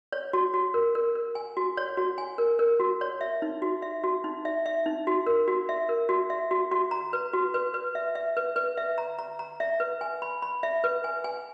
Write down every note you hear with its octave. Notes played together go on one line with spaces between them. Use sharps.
C#5
F#4
F#4
A#4
A#4
A#4
G#5
F#4
C#5
F#4
G#5
A#4
A#4
F#4
C#5
E5
D#4
F#4
E5
F#4
D#4
E5
E5
D#4
F#4
A#4
F#4
E5
A#4
F#4
E5
F#4
F#4
A#5
B4
F#4
B4
B4
E5
E5
B4
B4
E5
A#5
A#5
A#5
E5
B4
G#5
B5
B5
E5
B4
G#5
G#5